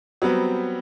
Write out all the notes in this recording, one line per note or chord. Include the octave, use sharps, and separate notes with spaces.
F#3 G3 B3 C4